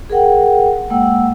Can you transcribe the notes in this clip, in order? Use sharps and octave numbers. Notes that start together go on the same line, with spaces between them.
G#4 A#4 F#5 G5
G#3 A#3 F#5 G5 E6